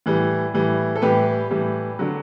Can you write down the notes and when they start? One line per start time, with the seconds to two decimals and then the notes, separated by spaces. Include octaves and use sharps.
0.06 A2 E3 G3
0.54 A2 E3 G3
0.96 A4
1.02 A2 E3 G3 G4 B4
1.50 A2 E3 G3
1.99 D3 F#3